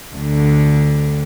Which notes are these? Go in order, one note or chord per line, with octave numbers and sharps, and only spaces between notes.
D2 D3